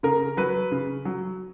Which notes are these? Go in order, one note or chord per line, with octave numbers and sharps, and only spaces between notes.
C#3 A#4
F#3 B4
C#3
F#3